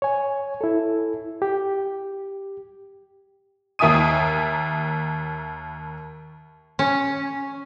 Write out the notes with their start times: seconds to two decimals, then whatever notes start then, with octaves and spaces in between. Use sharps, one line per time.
0.02 C#5 G#5
0.61 E4 A4
1.42 G4
3.79 D#2 A#3 E5 G#5 D#6 D#7
6.79 C#4